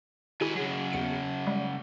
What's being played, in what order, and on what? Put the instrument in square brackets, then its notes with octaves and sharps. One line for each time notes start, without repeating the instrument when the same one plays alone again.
[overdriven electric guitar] D#3 G#5 [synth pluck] E4 F#4 G#4
[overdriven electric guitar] C#3 F#3
[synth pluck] E2 C#7 D7
G3 G#3